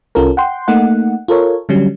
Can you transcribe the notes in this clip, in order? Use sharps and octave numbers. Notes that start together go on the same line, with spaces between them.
C2 C#4 F4 A4 A#4
F#5 G5 C6
A3 A#3 D#4 F#5
F4 A4 A#4 C#5
D3 F#3 G3 C#4